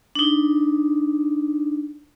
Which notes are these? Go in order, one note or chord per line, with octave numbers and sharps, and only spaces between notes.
D4 D#4